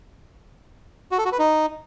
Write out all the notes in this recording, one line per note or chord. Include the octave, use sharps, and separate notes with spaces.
F#4
A4
F#4
B4
D#4